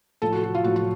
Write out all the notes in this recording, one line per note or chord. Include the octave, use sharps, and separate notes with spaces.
A2 F3 A4
F#4
F#4
F4
A2 F3 F#4
F#4